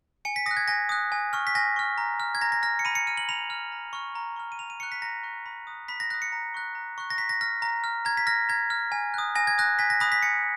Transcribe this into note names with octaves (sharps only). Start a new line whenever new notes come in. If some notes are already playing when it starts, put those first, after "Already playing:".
G#5 C#7
B6
D#6 A#6
F#6
G#6
G#5 A#6
D#6 F#6
G#5
C#6 F6
B6
G#5 A#6
C#6 F6
A#5
F6
G#6
A#5 A#6
A#6
F6 A#6
C#7
B5 D#7
C#7
F6 D#7
F#7
B5 F7
F6
A#5
C#6 F6
A#5
C#6 F6
D#7
A#5 F7
D#7
C#6 F#6 C#7
B6
A#5 A#6
C#6 F#6
B5
D#6 F#6
B5 B6
A#6
D#6 F#6 A#6
C#7
A#5
C#6 F#6
A#5
C#6 F#6
A#6
A#5 B6
A#6
F6 A#6
A#5 A#6
F6
A#5 G#6
B6
F6 A#6
A#5 G#6
F6
G#5
D#6 F#6
G#5 A#6
G#6
D#6 F#6 A#6
G#5 B6
A#6
B5 D#6 F#6 A#6
B6
G#5 C#7